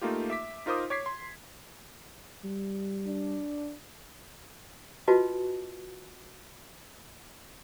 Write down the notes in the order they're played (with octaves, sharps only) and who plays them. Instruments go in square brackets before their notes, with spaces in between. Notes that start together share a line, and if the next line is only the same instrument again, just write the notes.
[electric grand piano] A3 A#3 D#4 F4 G4
E5 D6 B6
D#4 F4 A#4 C5 D6 D#6
C#5 D6 G#6 B6 C7
C6
[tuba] G3
[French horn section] D4
[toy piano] F4 F#4 B4 D#5 A5